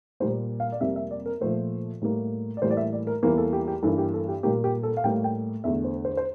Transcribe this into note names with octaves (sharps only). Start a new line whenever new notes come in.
A#2 G3 A#3 C5
F5
D5
F2 C3 G3 A#3 E5
E5
D5
A#4
A#2 F3 A3 C5
A2 G3 A#3
D5
A2 E3 G3 A#3 C5
D5
E5
D5
A#4
E2 E3 G3 A#3 A#4
A4
G4
G4
G2 E3 A#3 A4
G4
A4
G4
A#2 G3 A#3 G4
G4
A4
F5
A2 G3 A#3 G5
G5
E2 D3 A3 E5
C5
C5
C5